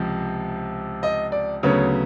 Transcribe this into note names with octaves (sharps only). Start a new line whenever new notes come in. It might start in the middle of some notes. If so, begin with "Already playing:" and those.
Already playing: C#2 C3 F3
D#5
D5
D2 C#3 F#3 B3 C#5